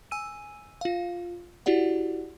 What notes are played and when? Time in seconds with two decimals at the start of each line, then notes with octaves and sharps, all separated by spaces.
0.11 G#5 E6 D#7
0.81 F4 F5
1.66 E4 F#4 G4 D5 F#5